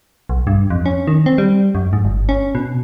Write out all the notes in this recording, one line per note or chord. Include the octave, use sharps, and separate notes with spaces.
B1
G2
F2
C#4
D#3
C4
G3
F#2
G#2
G1
C#4
B2